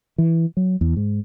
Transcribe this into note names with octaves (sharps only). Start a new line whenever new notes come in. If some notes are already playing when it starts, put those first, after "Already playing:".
E3
F#3
E2
G#2